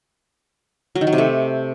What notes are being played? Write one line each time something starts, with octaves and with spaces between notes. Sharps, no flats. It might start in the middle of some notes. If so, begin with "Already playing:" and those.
F#3
D#3
F#3
C3
A3